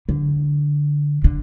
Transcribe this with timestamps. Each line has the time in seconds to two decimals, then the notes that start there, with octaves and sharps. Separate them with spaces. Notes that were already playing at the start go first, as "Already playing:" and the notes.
0.09 D3
1.24 D3